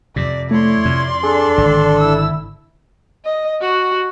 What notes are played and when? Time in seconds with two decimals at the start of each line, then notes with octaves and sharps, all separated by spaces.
0.16 F2 C3 D5
0.51 A3 E4 C#5 D5 C6
0.85 F2 C3
1.23 D4 G#4 A4
1.58 G#1 D3
1.99 E4 E6
3.25 D#5
3.61 F#4